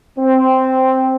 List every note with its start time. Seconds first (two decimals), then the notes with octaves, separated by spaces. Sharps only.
0.18 C4